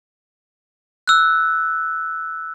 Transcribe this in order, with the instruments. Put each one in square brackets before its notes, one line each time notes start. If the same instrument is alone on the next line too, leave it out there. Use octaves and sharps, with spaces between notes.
[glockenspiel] E6 F#6